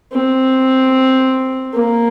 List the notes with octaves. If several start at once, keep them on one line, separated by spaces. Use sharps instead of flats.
C4
A#3